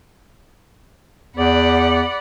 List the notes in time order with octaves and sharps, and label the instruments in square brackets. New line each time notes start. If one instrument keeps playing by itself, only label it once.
[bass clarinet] E2 [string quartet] D5 F#5 B5